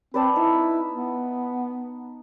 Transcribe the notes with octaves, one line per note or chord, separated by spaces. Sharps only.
C4 B4 D5 A5
D#4 E4
B3